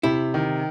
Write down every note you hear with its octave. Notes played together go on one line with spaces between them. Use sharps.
C3 E4
D#3